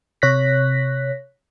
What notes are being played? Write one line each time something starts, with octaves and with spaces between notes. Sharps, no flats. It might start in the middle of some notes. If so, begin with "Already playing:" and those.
C3 C#5 F#6 A#6 B6